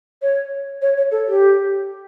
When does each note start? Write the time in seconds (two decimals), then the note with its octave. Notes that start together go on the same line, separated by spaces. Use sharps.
0.22 C#5
0.82 C#5
0.97 C#5
1.11 A4
1.27 G4